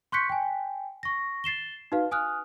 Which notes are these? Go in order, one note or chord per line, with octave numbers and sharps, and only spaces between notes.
C6 C#6 F#6 G6 B6 C#7
G5 G#5
C#6 A#6
A6 C7 E7 G7
D#4 F#4 B4 F5
G#5 D#6 F6 F#6